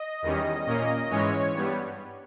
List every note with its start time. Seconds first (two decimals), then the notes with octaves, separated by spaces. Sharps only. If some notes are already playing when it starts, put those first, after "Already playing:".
Already playing: D#5
0.22 E2 D#3 G3 C#4
0.66 A#2 A#3 C#4 D#5
1.10 G#2 E3 G#3 C#4 C#5
1.53 G2 G3 B3